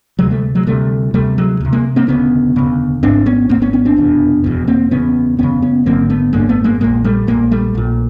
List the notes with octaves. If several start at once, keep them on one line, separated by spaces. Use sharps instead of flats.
D2 C3 F#3 G#3
G3 A3
F#3 G#3
D2 C3 G3 A3
D2 C3 G3 A3
F#3 G#3
D2 C3
G#3 A#3
A#3 C4
E1 D2 C#3 B3 C#4
E1 D2 C#3
G#1 G#2 C4 D4
B3 C#4
G#1 G#2 A#3 C4
B3 C#4
B3 C#4
C4 D4
F1 E2 B2
F1 E2 B2
A#3 C4
F#1 E2 C#3 B3 C#4
F#1 E2 C#3 B3 C#4
B3 C#4
G#1 F#2 D3 A#3 C4
A3 B3
G#1 F#2 D3 G#3 A#3
A3 B3
G#3 A#3
A#1 A#2 G#3 A#3
G3 A3
A#1 A#2 G#3 A#3
G3 A3
A#1 A#2